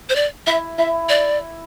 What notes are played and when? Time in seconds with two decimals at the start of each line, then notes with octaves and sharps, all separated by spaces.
0.09 C5
0.16 D5
0.47 E4 E5
0.78 E4 E5
1.09 D5